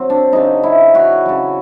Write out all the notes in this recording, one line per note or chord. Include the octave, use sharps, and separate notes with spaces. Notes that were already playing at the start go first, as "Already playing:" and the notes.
Already playing: F#3 C4
D4
C#3 F#3 D#4
E4
F#4
C#3 F#3